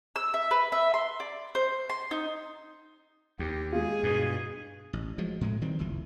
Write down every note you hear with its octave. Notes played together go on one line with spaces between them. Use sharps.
E6
E5
B4
E5
C6
D5
C5
C6
D#4
D#2 G4
G#3 F4 G#4
G2 B2
A1
F3 F#3 G#3
A2 G#3 A3
D#3 E3 G3 C4
F#1 C2 F2 E3